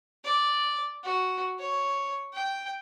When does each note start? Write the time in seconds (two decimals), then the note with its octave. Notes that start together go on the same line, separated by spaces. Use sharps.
0.25 D5
1.04 F#4
1.59 C#5
2.33 G5